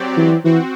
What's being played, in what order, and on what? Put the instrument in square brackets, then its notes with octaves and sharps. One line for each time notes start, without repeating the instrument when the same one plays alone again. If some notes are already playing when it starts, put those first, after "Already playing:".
Already playing: [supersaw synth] F#3 C4 G4 D5
[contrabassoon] E3
[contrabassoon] E3 [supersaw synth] C4 F#4